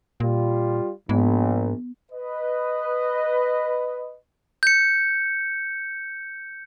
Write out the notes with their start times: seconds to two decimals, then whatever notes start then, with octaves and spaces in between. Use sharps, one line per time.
0.20 A#2 G3 F4
1.09 A#1 G#2 B3
2.12 B4 D#5
4.63 G6 C#7